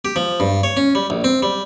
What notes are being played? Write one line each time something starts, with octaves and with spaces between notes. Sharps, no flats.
G4
F3
G2
C#5
C#4
G3
A#1
C4
G3